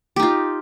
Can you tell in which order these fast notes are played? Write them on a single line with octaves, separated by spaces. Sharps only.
G4 D#4 F4